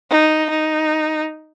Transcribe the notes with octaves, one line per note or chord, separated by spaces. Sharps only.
D#4
D#4